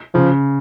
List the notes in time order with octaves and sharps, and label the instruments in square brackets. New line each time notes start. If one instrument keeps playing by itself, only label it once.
[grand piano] C#3 [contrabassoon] F3